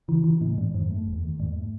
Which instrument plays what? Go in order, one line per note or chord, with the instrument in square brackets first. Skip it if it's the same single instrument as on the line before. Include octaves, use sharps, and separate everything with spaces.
[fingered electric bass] C#3 [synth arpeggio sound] E3
[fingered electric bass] C#3 [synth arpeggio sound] E3
[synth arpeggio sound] A2 [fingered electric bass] C#3
[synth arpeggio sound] G#2 [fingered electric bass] E3
[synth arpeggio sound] F#2 [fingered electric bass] D#3
[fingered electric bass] A3
E2
D#3
[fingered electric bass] E2 [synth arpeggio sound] G#2
[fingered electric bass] A3